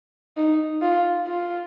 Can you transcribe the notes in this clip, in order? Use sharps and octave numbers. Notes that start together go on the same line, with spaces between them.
D#4
F4
F4